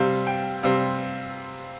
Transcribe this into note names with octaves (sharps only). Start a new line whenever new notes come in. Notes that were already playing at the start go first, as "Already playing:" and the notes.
Already playing: C3 G3 C4 F5
G5
C3 G3 C4 F5